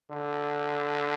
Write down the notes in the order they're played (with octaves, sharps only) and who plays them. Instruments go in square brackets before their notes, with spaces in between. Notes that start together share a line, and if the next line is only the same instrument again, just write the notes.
[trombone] D3